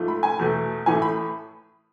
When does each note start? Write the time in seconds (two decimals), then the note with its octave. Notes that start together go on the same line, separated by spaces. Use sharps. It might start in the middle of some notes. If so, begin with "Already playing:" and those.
Already playing: G#2 F3 A3
0.08 B5
0.23 G#5
0.39 E2 B2 A3
0.86 A2 E3 A3 G#5
1.02 B5